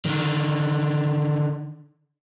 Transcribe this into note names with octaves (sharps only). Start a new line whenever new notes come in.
D3 D#3